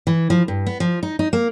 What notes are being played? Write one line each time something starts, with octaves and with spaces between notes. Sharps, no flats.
E3
F3
G2
B3
F3
D#4
D#4
A#3